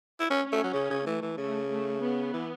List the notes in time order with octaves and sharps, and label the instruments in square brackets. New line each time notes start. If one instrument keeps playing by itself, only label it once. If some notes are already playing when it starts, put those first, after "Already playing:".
[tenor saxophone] E4
C#4
[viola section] C#4
[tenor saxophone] A3
F#3
C#3
C#3
[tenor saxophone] E3 [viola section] A3
[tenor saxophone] E3
[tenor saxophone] C#3 [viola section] A3
[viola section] A3
B3
[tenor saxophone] E3